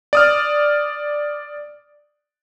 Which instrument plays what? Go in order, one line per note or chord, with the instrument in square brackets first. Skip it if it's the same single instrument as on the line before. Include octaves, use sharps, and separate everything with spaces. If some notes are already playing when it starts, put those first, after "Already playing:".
[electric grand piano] D5 D#6 F6